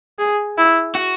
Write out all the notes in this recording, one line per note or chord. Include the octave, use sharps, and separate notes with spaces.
G#4
E4
F#4